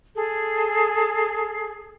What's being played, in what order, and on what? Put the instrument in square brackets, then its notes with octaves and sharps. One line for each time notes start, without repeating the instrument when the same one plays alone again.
[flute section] G#4 A4